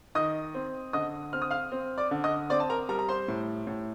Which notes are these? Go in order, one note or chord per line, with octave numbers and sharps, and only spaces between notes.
D#3 D#5 D#6
C4
D3 D#5 D#6
C4 F6
D#6
F5 F6
C4
D5 D6
D3
D#5 D#6
C4 D5 D6
A5
A#4 A#5
G3 A#4 A#5
A#5
C5 C6
A2
A2